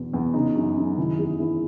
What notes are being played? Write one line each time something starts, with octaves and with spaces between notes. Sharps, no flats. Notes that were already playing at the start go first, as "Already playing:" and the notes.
Already playing: E2 B2
E2
C#3 D#4
F#2
F#2
D#3 E4
E2 G#4
E2 E4